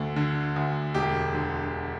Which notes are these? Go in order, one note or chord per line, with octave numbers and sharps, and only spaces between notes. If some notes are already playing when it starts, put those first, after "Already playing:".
Already playing: D2 D3 A4
D3
D2
E1 G4
D3